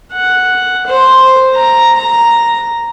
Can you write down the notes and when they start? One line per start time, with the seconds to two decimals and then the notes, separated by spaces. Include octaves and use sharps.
0.13 F#5
0.87 C5
1.55 A#5
1.96 A#5